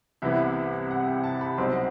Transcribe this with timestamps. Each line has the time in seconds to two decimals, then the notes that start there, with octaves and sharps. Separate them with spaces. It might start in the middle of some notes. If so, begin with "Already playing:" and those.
0.22 C2 C3 E3 B3 E4 E5
0.91 F#5
1.07 G5
1.24 A5
1.41 B5
1.57 C2 B2 F#3 C4 D#4 C6